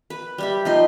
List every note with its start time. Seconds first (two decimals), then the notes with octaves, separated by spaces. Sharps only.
0.10 B4
0.38 G3 G4 E5
0.65 F3 D#4 C6